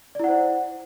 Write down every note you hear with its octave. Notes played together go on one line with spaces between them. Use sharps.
E4 C5 D5 F#5